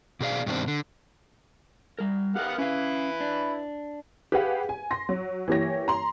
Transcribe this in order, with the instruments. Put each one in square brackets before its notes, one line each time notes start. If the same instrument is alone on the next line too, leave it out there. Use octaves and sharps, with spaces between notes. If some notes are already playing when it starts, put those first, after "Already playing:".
[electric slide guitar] B2 G#4 D5 F5
G2 B2 D#3 C4 D4
D3
G3 A#4
[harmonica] B3 F5 F#5 [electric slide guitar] G4 A#4
[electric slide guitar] C#4 F5 [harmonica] E4 B4
[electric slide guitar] D4
[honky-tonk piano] G4 G#4 B4 F5 F#5
G#5
C6 A#6
F#3
E3 A#3 G4 C#5 A#6
A#5 C6